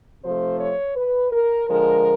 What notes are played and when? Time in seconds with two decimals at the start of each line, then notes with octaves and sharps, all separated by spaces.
0.22 C3 F3 A3 C5
0.59 C#5
0.95 B4
1.31 A#4
1.68 D3 F3 G#3 A#4